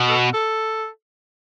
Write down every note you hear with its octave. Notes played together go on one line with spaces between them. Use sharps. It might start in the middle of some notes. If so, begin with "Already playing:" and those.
Already playing: B2
A4
A4